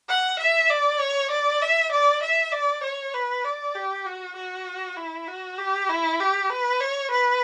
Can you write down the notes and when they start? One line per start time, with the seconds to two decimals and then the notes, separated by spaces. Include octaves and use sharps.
0.09 F#5
0.39 E5
0.70 D5
1.00 C#5
1.31 D5
1.62 E5
1.92 D5
2.23 E5
2.52 D5
2.84 C#5
3.14 B4
3.44 D5
3.75 G4
4.06 F#4
4.36 F#4
4.97 E4
5.28 F#4
5.58 G4
5.89 E4
6.20 G4
6.50 B4
6.80 C#5
7.11 B4